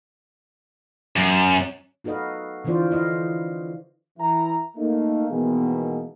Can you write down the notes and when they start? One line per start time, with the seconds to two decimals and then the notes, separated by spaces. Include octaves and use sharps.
1.16 F#2
2.04 D#4 F#4 A4 B4 D#5 F5
2.64 D3 E3 E4 F4 C5 D5
2.91 E4 D#5 F5
4.18 E3 E4 A#5
4.77 A3 A#3 D#4
5.29 B2 D#3 E3 G#3 A#3 B3